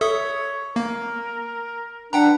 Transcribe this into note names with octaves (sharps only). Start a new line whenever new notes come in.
A4 C#5 E5 D#6
A#3 A#4
D4 B4 F#5 G5 A#5